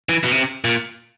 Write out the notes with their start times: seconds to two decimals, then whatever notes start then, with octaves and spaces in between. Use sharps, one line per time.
0.09 E3
0.24 B2
0.32 C3
0.64 A#2